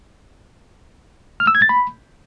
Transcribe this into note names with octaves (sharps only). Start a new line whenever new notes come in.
F6
E6
G#6
A6
B5